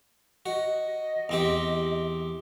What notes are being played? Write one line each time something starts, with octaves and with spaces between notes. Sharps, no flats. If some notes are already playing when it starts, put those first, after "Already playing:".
F#4 D#5
E2 C4 G4